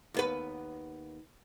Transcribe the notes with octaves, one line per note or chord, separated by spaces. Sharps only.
D#2 B3 B4